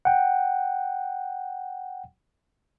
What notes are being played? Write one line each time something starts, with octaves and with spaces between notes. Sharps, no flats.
F#5 G5